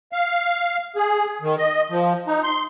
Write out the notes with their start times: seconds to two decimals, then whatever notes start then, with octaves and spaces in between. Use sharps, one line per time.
0.13 F5
0.96 G#4
1.42 D#3
1.58 D#5
1.90 F3
2.27 D#4
2.43 C6